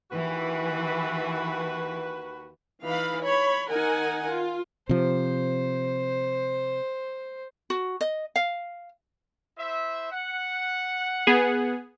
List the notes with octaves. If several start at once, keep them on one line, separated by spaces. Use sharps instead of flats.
D#2 E3 F#4 B4
E3 D#4 F5 B5
C#5 B5
D#3 D#4 A#4 F#5 G#5
F4
C3 F3 C5
F#4
D#5
F5
E4 C5 E5
F#5
B3 G#4